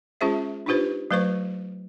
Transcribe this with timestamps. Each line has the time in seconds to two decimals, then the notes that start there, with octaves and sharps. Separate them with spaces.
0.21 G#3 C#4 F4 G#4 C5 E5
0.66 D4 D#4 F4 G4 B4 C5
1.11 F#3 A3 B4 C5 C#6